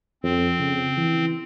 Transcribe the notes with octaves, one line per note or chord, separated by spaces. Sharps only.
F2 C4
C#3
E3